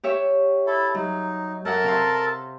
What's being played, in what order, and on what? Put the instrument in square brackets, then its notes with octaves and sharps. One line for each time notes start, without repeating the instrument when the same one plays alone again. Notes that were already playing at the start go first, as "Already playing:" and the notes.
[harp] G4 C#5 E5
[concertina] E4 A4
[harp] F#3 [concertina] D#4
[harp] F#2 F#5 [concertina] A4 A#4 A5
[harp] C3 F5 C6